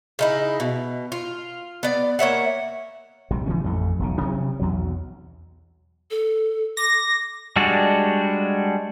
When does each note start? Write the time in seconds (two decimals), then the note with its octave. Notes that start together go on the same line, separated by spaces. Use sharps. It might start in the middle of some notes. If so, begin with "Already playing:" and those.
0.19 C#3 D#4 E4
0.60 B2
1.12 F4
1.83 B3 D5
2.19 A#3 C#5 E5 F#5
3.31 A#1 C3 G3
3.46 D3 E3 A3 C#4
3.64 A1 F2 A3
3.99 E1 B1 C#3
4.21 C3 F#3 B3 C#4
4.59 B1 E2 F#3
6.11 A4
6.77 D6 A#6
7.56 G3 G#3 D4 F#4